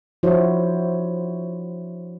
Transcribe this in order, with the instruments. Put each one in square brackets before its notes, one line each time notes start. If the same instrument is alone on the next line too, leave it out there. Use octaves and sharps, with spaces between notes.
[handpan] F3 D4 E4 F#4 C5 C#5